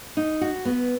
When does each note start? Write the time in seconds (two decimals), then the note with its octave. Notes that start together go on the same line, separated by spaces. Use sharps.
0.17 D#4
0.41 F#4
0.65 B3